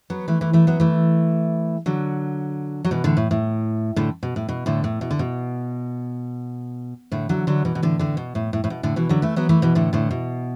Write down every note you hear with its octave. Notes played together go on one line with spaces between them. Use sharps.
F#3 B3
E3 A3
E3 A3
E3 A3
F#3 B3
E3 A3
D3 F#3
F#3
B2 E3
A2 D3
A2
A2
A2 D3
B2
A2
B2
A2 D3
A2
B2
D3
B2
A2 D3
D3 F#3
D3 F#3
B2 E3
B2
A2 D3
A2 D3
B2
A2
A2
A2
B2
A2 D3
B2 E3
D3 F#3
E3 A3
F#3 B3
E3 A3
B2 E3
A2 D3
A2 D3
B2